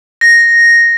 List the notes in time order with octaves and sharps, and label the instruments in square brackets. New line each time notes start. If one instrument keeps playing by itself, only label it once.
[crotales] A#6